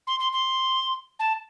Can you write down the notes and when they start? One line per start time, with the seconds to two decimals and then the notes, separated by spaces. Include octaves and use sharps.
0.07 C6
0.20 C6
0.32 C6
1.19 A5